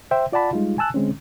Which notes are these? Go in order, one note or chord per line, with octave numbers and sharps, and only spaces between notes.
C5 E5 G5
F4 D5 F#5 A5 B5
G3 G#3 D#4 F4
G#5 A5 E6 F#6
D3 G#3 C4 C#4